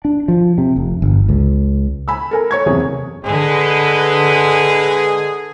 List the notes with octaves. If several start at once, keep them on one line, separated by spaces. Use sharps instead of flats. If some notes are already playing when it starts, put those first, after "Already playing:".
D4
F3
C3
F1
G1
C#2
G#5 B5 E6
A4 A#4 G#5
C#5 C#6 G#6
F#1 E2 C3 G#4
D3 G#3 G#4 B4